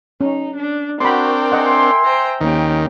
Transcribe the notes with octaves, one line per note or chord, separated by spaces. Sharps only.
C#4 D#4
D4
C4 D4 F#4 A#4 G5 B5 C6
D#5 E5 F#5 G#5 C6
C5 G5 A#5
D#2 D#3 A#3 C#4 G4